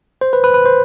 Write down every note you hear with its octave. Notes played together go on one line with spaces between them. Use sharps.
C5
B4
B4
B4
C5